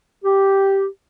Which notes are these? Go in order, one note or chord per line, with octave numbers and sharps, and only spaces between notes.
G4